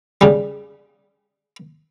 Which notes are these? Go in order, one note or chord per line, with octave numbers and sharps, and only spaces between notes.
C#3 G3